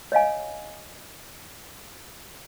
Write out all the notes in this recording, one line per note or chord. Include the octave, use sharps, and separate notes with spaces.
C#5 D#5 F5 G#5